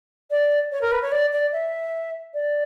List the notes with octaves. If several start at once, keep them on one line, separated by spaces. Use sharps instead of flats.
D5
C#5
A#4
B4
C#5
D5
D5
E5
D5